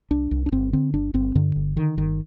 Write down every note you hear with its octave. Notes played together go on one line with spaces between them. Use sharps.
C2 D4
C2
D4
G1 C4
D3 C4
G1 D4
G1 C4
G2 D3
G1
D3 D#3
G1 D#3